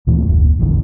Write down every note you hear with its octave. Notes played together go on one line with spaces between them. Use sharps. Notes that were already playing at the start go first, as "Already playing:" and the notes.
D2 A#2 E3 A3
F1 D2
E1 A1 E2 D3